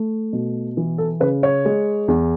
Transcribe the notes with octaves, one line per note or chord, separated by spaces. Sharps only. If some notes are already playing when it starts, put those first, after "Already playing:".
Already playing: A3
B2
E3
A4
C#3 B4
C#5
G#3
E2